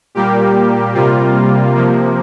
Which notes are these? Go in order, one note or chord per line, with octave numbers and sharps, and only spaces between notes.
A#2 G3 A#3 G4
C3 G3 A#3 F4
C3 F3 A#3